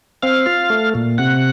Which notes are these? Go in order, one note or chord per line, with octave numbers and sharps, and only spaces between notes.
C4 F5
F4
A3
A#2
C3 F#5